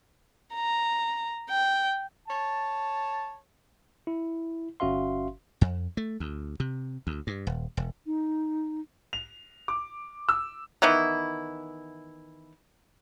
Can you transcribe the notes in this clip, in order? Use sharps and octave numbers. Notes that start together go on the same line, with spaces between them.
A#5
G5
C#5 A5
E4
G1 C#4 F#4 E5 F5 C6
F2
A3
D2
C3
D2
G2
D#1
E1
D#4
F7
D6
E6
D#3 E3 B3 E4